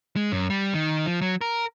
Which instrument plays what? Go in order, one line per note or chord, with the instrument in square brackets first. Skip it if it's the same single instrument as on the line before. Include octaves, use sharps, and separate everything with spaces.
[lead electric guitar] G#3
F#2
G3
D#3
F3
F#3
A#4